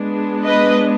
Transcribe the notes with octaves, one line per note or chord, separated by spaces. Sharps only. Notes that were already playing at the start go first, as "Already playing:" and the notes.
Already playing: G#3 B3 D4
B4 D#5